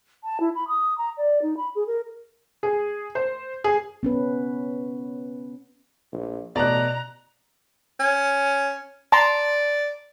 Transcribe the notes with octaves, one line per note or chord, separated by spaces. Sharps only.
A5
E4
B5
D#6
A#5
D5
D#4
B5
G#4
A#4
G#4
C5
G#4
B3 C#4 B4
A#1
A1 B2 D5 A5 A#5 F#6
C#4
D5 A5 A#5 C6